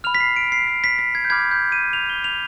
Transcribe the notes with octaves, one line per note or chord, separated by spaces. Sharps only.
B5 F6 F7
B6
C7
D7
C7
B6
B6
B6
G#6
G6
B5 D6 F6 G#6
G6
D#7
F7
G7
F7